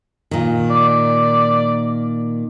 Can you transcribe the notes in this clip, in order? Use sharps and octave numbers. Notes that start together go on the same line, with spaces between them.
A#2 D#3
D5